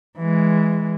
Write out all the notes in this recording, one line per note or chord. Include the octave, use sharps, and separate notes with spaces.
E3 G#3